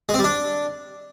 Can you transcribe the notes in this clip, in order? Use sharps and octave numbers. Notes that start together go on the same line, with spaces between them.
G#3
C4
G3
D4